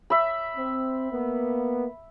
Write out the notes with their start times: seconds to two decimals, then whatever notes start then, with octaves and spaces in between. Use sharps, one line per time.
0.10 E5 B5
0.56 C4
1.11 A#3 B3